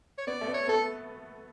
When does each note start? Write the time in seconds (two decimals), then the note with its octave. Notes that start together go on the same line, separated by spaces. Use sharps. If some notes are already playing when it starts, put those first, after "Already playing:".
0.18 C#5
0.27 B3 D5
0.41 A3
0.47 B3
0.54 C#5
0.67 B3 A4